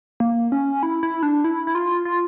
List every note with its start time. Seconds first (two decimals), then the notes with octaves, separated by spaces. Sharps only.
0.20 A#3
0.52 C#4
0.83 E4
1.03 E4
1.23 D4
1.44 E4
1.67 E4
1.75 F4
2.05 F4